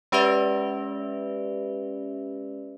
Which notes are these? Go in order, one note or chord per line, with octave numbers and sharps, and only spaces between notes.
G#3 C#4 G4 B4 D5 E5